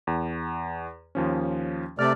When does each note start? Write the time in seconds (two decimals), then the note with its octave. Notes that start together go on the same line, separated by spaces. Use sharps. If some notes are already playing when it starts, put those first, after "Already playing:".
0.07 E2
1.15 D#2 F3 C#4
1.99 C3 A3 D5 F6